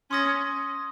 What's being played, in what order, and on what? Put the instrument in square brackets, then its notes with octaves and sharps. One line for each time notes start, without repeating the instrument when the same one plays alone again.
[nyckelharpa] C#4 [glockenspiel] C6 D#6 A#6